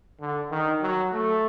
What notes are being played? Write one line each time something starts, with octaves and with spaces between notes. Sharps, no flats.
D3
D#3
F#3
A3